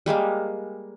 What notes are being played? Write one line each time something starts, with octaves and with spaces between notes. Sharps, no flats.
G3 G#3 A#3 F5